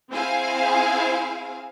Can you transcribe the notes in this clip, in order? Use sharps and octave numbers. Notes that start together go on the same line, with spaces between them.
C4 E4 G#4 C5 F5 G#5